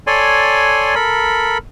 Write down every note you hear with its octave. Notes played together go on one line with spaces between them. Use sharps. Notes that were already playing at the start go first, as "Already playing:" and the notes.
A4 C#5 D5 G#5 C6
A4 A#4 B5